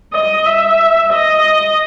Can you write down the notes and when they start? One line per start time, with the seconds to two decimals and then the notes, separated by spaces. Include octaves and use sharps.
0.13 D#5
0.46 E5
1.13 D#5